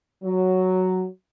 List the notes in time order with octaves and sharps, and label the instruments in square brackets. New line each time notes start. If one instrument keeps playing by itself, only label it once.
[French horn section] F#3